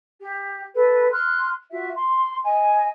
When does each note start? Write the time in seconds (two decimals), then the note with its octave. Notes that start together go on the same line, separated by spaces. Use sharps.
0.19 G4
0.74 A4 B4
1.11 C6 F6 F#6
1.72 F4 F#4 E5
1.95 C6
2.45 D#5 G#5